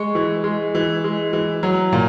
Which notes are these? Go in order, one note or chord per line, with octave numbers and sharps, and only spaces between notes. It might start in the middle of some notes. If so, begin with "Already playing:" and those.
Already playing: G#3 C#6
E3
G#3
E3
G#3
E3
F#3
A#2